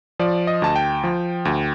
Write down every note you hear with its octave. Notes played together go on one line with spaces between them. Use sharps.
F3 D5
D#5
D2 A5
G5
F3
D2